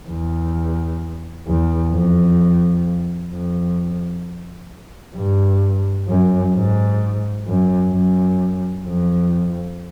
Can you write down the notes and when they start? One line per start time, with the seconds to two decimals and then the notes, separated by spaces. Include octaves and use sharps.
0.08 E2
1.47 E2
1.92 F2
3.31 F2
5.15 G2
6.08 F#2
6.54 G#2
7.47 F#2
7.93 F#2
8.86 F2